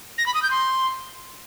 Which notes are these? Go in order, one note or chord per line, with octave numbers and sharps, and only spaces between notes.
A#6
B5
D#6
G6
C6